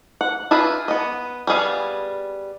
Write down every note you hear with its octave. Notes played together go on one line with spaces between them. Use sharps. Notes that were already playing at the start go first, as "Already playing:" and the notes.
F#5
E4 F4 G#4 B4
B3 D#5
G3 B3 G#4 F5